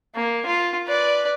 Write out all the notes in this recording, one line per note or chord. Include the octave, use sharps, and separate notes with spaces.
A#3
F4
B4 D5